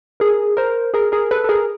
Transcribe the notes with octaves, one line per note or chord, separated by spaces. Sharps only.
G#4 A#4
A#4 C5
G#4 A#4
G#4 A#4
A4 B4
A4
G#4 A#4